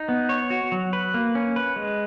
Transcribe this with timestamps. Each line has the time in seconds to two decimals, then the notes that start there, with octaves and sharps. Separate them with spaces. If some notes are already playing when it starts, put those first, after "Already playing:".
Already playing: D#4
0.09 B3
0.29 C#5
0.50 F#4
0.72 F#3
0.93 B4
1.14 A#3
1.35 C#4
1.56 B4
1.76 G#3